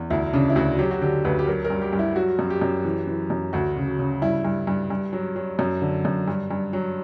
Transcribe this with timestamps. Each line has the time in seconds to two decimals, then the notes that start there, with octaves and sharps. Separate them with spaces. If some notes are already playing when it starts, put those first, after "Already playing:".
Already playing: E2
0.10 D2 E4
0.33 C#3 D4
0.50 E4
0.56 D2 F#4
0.79 F#3 G4
0.91 F#4
1.02 D3 G4
1.25 D2 B4
1.39 G4
1.47 F#3 A#4
1.64 A#4
1.70 G2
1.82 G4
1.93 G2
1.99 E4
2.16 F#3 F#4
2.39 F#2
2.50 G4
2.61 F#2
2.85 E3
3.07 E3
3.30 F#2
3.53 D2 F#4
3.76 C#3
3.99 C#3
4.22 G2 E4
4.45 G2
4.67 G2
4.90 G2
5.13 F#3
5.36 F#3
5.59 F#2
5.82 D3
6.05 F#2
6.28 G2
6.51 G2
6.73 F#3